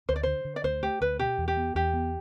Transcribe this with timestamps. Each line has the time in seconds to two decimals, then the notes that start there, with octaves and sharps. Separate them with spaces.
0.09 D2 C5
0.16 D5
0.23 D3 C5
0.45 D3
0.56 D5
0.64 D2 C5
0.82 A3 G4
1.01 D2 B4
1.19 B2 G4
1.38 E2
1.48 G4
1.57 B3
1.75 E2 G4
1.94 B3